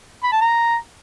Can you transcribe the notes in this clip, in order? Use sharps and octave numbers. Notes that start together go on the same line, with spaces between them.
B5
A5
A#5